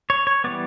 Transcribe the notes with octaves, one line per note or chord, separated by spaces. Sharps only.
C#5
C#5
E3 G3 B3 D5